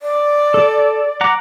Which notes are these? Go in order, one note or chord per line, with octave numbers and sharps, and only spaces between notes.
D5
A4
F#5 A#5 D6